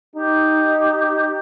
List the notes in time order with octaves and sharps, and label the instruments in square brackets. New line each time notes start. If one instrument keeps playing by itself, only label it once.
[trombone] D#4 [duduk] G4